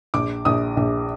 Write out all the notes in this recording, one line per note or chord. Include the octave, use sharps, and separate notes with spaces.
A#1 D6
A#1 D#6
A#1